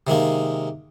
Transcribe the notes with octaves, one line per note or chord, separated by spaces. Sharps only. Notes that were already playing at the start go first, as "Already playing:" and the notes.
C3 D#3 G#3 A#3